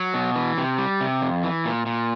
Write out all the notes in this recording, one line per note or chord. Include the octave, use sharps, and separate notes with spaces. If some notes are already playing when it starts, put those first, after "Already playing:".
Already playing: F#3
B2
E3
C3
G3
C3
F2
E3
A#2
A#2